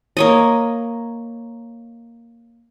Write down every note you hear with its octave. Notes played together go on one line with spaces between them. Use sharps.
A#3 C#5 D#5